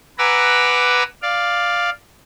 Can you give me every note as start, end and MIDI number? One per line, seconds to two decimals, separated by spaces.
0.18 1.03 71
0.18 1.03 78
0.18 1.03 80
0.18 1.03 82
0.18 1.03 86
0.18 1.03 88
1.22 1.90 74
1.22 1.90 77